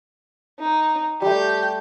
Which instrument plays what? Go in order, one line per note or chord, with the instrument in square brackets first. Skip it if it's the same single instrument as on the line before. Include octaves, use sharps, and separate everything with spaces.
[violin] D#4
[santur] G3 A3 [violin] G4 G6